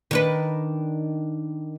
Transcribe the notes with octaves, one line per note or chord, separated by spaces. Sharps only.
D#3 D4 B4